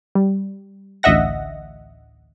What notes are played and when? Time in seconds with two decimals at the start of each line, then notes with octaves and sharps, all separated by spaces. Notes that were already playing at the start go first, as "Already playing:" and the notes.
0.15 G3
1.03 A1 D2 D#5 E5 F#5 A#6